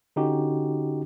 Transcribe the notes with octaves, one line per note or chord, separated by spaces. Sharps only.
D3 C#4 D#4 F#4 G4